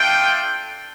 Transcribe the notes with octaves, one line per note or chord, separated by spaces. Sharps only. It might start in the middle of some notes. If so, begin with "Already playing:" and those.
Already playing: A3 D4 F4 G5